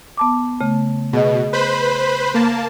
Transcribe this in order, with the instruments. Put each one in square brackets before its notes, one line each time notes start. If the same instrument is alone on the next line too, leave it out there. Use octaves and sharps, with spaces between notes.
[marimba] B3 A5 D6
C#3 A3
[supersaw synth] B2 [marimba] G#4 D#5
[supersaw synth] B4 C5 B5
A#3 A5